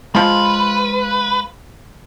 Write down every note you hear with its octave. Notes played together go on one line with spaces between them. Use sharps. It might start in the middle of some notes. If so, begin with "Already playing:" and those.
F3 G#3 F4 B4 F5